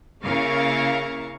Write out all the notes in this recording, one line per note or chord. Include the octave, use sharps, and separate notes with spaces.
C#3 A#3 E4 A#4 F5 C#6